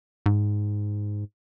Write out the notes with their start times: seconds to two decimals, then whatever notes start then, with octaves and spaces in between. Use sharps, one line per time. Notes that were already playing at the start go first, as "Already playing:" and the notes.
0.26 G#2